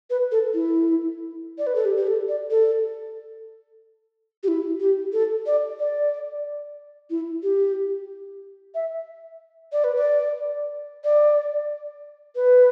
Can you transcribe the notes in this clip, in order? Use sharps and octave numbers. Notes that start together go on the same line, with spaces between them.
B4
A4
E4
D5
B4
A4
G4
G4
A4
D5
A4
G4
E4
G4
A4
D5
D5
E4
G4
E5
D5
B4
D5
D5
B4